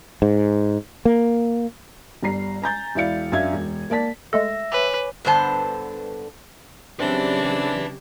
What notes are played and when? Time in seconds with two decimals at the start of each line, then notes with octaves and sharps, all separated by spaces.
0.22 G#2
1.05 A#3
2.22 G1 G3 A#5 C7
2.62 G#5 A#5 G6 A6
2.95 E1 E4 D5 F5 C#7
3.32 F#2 D4 E5 F5 G#6
3.53 E1
3.90 A#3 D5 A5 B6
4.33 G#3 A3 A4 E5 A#6
4.72 B4 C#5 G#5 D6
5.25 G2 D3 B3 C5 A5
6.99 C#3 F#3 C4 D4 G4 B4 E5